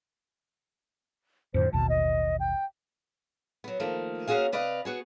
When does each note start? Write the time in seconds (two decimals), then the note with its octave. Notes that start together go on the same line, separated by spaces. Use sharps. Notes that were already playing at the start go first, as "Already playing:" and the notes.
1.54 F2 A2 D3 C5
1.73 A1 D#2 B2 A5
1.89 D#5
2.40 G5
3.64 F#3 B3
3.80 D#3 F3 A3 A#3
4.27 A#3 C#4 D4 F#4 G#4 F5
4.52 C3 B4 D5 D#5 F5
4.85 B3 F#4 G#4